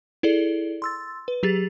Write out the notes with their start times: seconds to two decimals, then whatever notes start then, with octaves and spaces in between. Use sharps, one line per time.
0.23 E4 G#4 A4 D5
0.82 C6 E6 A6
1.28 B4
1.43 F#3 G4 G#4 A6